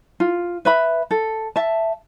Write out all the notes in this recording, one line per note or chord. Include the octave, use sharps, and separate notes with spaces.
F4
B4 E5 B5
A4
E5 A5